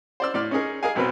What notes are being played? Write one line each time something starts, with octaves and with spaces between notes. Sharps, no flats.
C5 D5 E6
A2 D5 C6 F6
C#4 D#4 G#4 A#4
G#4 A#4 D#5 F5 G#5
B1 B2 F#3 C4 A#4 B4